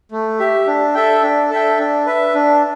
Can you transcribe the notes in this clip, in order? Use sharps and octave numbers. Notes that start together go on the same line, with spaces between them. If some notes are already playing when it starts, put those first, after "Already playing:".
A3
G4 E5
D4
A4 E5 G5
D4
A4 E5 G5
D4
B4 E5
D4